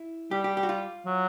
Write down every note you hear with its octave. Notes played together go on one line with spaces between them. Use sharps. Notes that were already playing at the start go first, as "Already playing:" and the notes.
Already playing: E4
G3 G4
G4
G4
F#4
F4
F#3